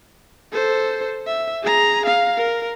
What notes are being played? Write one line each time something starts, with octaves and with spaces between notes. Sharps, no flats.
A4 C5
E5
G#4 A#5
F5
A#4